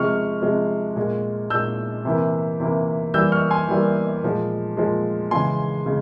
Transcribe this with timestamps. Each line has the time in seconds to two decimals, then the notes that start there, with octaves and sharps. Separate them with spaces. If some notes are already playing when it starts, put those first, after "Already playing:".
Already playing: C3 F3 G#3 C#6 F6
0.42 C3 F3 G#3
0.96 A#2 G#3
1.50 A#2 G#3 E6 G6
2.05 C3 E3 A#3
2.60 C3 E3 A#3
3.14 E3 G3 A#3 E6 G6
3.32 C#6 F6
3.50 G#5 C6
3.68 E3 G3 A#3
4.23 A#2 F3 G#3
4.77 A#2 F3 G#3
5.31 C#3 E3 G#3 G#5 C6
5.86 C#3 G#3